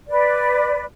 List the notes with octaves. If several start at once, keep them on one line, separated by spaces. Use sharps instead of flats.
B4 D5